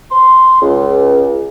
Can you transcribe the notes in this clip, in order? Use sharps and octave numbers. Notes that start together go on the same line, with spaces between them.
C6
C#2